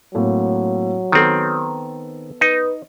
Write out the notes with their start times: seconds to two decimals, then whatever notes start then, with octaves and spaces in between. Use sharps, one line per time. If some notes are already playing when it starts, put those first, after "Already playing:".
0.15 A2 F#3 A#3 C4
1.12 D#3 B3 C4 A4
2.41 D#4 B4